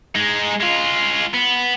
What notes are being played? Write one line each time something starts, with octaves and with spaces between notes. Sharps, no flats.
G#3 D#4
G#3 F4
B3